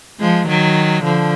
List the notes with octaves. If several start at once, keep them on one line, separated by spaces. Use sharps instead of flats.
F3 G#3
D#3 F#3
D3 F3